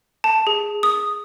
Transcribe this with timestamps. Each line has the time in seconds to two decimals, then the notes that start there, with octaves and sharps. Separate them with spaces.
0.24 A5
0.47 G#4
0.83 D#6